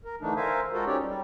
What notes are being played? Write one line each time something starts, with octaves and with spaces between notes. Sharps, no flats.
A#4
D3 E3 A3 D4 D#4
A#4 C5 E5 F5 G#5
G#3 F4 F#4 A4 A#4 C5
C#4 D#4 G4 C#5 D5
G3